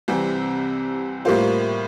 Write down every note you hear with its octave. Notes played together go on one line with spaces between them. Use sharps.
C2 C3 E3 G3 C4
A2 G3 A#3 F4 C5